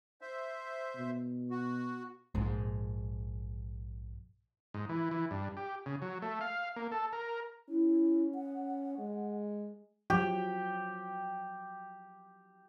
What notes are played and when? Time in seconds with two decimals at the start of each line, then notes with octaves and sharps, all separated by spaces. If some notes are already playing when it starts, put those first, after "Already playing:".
0.21 C5 E5
0.96 B2
1.50 F#4
2.35 A#1 G#2
4.74 G#2
4.89 E3
5.11 E3
5.31 G2
5.57 G4
5.86 C#3
6.02 F#3
6.22 A3
6.41 F5
6.76 A#3
6.92 A4
7.13 A#4
7.69 C#4 E4
8.35 F#5
8.98 G#3
10.10 F3 F#3 G4